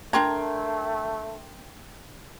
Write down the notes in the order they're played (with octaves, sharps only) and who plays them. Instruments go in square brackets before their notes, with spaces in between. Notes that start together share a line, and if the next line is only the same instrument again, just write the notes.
[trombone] A3 [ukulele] D4 A#4 A#5 [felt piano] G5 C6 G#6